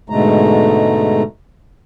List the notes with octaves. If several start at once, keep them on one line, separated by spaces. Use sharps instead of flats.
G#2 B2 D3 G#3 A3 A#5